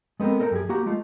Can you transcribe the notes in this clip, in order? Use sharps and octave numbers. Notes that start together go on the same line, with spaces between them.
G#3 B3 C4 A4 A#4
A4 A#4 D#5 F#5 G5 A#5
F#2 G4 G#4
A#3 F#4 G4 F#5 A#5
G#3 A3 F4